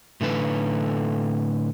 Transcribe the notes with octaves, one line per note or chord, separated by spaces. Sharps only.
A2 D3 A4 B4